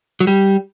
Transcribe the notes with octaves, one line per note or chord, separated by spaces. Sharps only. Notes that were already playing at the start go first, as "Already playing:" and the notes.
F#3
G3